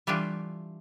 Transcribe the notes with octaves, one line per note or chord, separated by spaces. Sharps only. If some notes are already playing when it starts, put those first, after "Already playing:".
E3 G3 A3 D4 F4